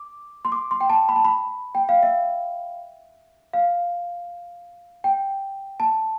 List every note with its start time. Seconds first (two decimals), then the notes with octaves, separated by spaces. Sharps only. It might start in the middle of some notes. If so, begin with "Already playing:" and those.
Already playing: D6
0.45 C6
0.52 D6
0.71 C6
0.81 G5
0.90 A5
1.09 B5
1.16 A5
1.25 B5
1.75 G5
1.89 F5
2.03 E5
3.53 F5
5.04 G5
5.80 A5